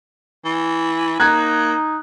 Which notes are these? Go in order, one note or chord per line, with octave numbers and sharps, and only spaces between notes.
E3
A#3 D#4 F#6 G#6